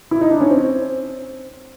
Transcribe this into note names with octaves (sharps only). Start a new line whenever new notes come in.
E4
D#4
D4
C#4
C4